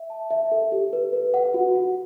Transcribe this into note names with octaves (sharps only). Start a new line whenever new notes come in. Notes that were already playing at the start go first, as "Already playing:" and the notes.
Already playing: E5
A5
E5
A4
G4
B4
B4
F#5
F#4
F#4